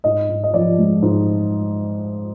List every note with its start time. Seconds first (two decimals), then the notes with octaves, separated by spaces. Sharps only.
0.04 G#2 D#5
0.29 G#2
0.43 D#5
0.54 F3 D5
0.78 G#3
1.02 G#2